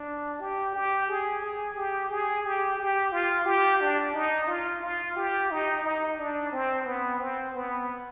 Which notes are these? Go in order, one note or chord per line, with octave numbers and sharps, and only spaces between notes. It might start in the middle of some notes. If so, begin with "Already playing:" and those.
Already playing: D4
G4
G4
G#4
G#4
G4
G#4
G4
G4
F4
G4
D4
D#4
F4
F4
G4
D#4
D#4
D4
C4
B3
C4
B3